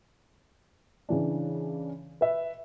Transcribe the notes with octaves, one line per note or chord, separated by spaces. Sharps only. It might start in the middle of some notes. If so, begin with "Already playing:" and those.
C#3 E3 D4
B4 E5